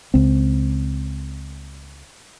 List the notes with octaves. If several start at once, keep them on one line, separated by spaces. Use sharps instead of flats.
C#2 C4